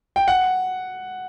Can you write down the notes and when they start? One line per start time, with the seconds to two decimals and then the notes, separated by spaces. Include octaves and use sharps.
0.16 G5
0.28 F#5